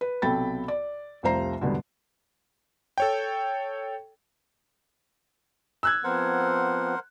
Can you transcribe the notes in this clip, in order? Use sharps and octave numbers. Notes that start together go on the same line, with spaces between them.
B4
B1 C3 A4 G5 B5 A6
D5
F1 C2 F4 C5 A#5 C7
E2 G#2 B2 D3 G3 B3
A4 C#5 G5
E6 F#6 G#6
F3 B3 C4 A#4 C5 F#5